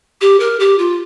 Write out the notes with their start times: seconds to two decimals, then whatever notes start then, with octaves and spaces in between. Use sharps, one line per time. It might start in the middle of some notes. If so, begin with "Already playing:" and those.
0.21 G4
0.40 A#4
0.60 G4
0.79 F4